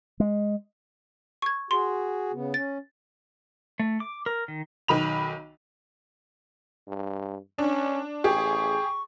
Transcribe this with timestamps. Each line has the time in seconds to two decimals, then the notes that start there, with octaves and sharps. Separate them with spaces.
0.20 G#3
1.42 C#6 G#6
1.71 F#4 G#4 C6
2.32 C#3 B3
2.54 C#4 A6
3.80 A3
4.00 D6
4.26 A#4
4.48 D#3
4.88 B1 D#3 B5 F7
6.87 G2
7.58 C#4 D4
8.24 A1 G4 G#4 C#6